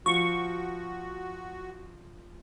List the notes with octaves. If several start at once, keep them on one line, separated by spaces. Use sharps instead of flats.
F3 F#4 C#6